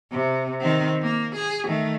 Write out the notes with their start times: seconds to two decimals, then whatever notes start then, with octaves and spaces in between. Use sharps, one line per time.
0.11 C3
0.61 D#3 C4
1.02 A#3
1.36 G#4
1.67 D#3 A3